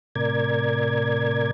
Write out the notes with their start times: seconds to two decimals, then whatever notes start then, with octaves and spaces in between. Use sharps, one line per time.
0.16 A2 C3 A#4 D5 G#6